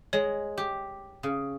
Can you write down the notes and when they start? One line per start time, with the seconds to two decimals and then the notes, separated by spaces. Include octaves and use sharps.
0.13 G#3 C#5
0.57 G4
1.23 C#3